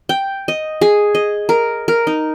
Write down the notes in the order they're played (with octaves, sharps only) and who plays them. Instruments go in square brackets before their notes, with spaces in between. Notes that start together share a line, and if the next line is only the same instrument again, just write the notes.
[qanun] G5
D#5
G#4
D#5
A#4
A#4
D#4